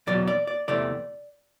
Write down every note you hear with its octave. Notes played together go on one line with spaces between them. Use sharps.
E2 B2 F#3 D5
D5
D5
E2 C3 E3 A3 D5